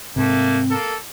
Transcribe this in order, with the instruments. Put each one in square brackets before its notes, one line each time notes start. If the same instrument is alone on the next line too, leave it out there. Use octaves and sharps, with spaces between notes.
[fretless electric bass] G#2 C3 [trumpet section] A3 A#3 [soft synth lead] C4
[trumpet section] A#3 A4